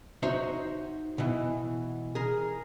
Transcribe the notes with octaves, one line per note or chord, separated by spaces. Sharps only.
D#4 F#4 C5 C#5 E5
B2 E3
G#4 A#4